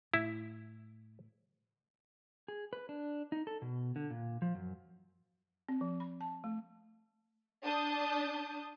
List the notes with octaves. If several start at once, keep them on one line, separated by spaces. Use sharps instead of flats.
A2 E4
G#4
B4
D4
D#4
A4
B2
D3
A#2
F3
F#2
C4
F3
B5
A5
A3
D4 A5 D#6 G6